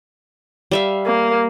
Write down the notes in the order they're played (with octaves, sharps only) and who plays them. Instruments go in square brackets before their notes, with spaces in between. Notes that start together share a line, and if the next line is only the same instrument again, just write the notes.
[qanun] G3 E5 F5
[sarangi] A#3